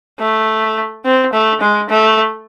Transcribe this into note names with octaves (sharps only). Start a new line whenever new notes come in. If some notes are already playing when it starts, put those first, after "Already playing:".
A3
C4
A3
G#3
A3